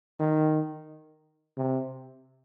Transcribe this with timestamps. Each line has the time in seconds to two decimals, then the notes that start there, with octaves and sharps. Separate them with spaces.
0.19 D#3
1.57 C3